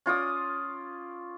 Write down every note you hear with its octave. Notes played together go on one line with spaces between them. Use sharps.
C#4 F4 D5 D#6